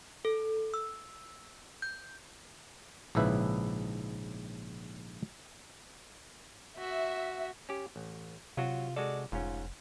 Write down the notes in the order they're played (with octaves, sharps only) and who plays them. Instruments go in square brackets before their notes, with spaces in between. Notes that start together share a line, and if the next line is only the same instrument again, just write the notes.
[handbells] A4
E6
G6
[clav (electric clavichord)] A#1 G#2 C#3 E4 B4 E5
[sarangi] F#4 [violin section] E5
[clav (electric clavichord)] C#4 G4
A1
[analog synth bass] C3 [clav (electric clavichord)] F#3 F#4 [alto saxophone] F4
[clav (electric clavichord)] G#3 F#4 A4 [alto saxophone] D5
[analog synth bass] F1 [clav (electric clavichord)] G#2 C#4 [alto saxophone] F4